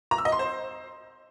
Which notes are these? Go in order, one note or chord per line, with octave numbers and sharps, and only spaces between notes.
A#5
E6
D#5
C6
C5